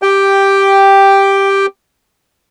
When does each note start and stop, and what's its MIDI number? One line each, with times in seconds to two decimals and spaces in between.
0.02 1.66 67
0.02 1.66 79